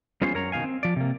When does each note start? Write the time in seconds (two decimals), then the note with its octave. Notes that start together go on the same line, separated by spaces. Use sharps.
0.22 G3 B3 C#4 F4 G#4 C5
0.34 F#2 A#4 C#5 A#5
0.52 B2 D#3 F5 G#5
0.64 C4
0.83 F3 D5
0.96 C3 A#3